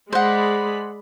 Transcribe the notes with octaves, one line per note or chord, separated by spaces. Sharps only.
G#3 C5 D5 F#5 B5